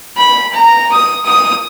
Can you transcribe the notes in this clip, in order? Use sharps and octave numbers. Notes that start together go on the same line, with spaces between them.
B5
A#5
D#6
D#6